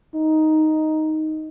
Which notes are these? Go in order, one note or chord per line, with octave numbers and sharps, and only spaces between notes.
D#4